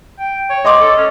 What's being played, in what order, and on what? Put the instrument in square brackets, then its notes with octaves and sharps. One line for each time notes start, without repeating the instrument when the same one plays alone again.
[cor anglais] G5
C#5
[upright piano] D#5 C6 D6
[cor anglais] A4
C#4